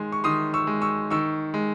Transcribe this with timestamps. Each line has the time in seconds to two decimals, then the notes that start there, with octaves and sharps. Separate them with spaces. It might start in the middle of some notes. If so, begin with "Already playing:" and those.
Already playing: D#3 G#3 G#5 C6
0.12 C#6
0.24 D#3 C6 D#6
0.54 C#6 E6
0.67 G#3
0.81 C#6 E6
1.10 D#3 C#6 E6
1.54 G#3